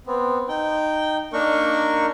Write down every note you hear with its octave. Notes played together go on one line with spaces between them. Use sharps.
B3 C4
D#4 G5
A#3 D4 D#4 A#4 C#6